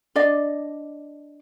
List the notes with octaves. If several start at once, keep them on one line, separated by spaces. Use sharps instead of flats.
D4 D5 D#5